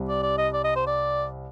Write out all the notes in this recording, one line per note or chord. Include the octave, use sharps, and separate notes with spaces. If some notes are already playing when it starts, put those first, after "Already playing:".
Already playing: C2 C3 G3
D5
D5
D#5
D5
D#5
C5
D5